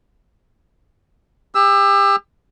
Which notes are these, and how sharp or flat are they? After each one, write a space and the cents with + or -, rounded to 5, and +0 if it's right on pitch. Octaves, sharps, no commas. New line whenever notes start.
G4 +35 E6 +0